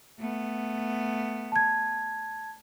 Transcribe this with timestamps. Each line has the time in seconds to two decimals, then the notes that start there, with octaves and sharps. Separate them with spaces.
0.20 A3 B3
1.52 A5 G#6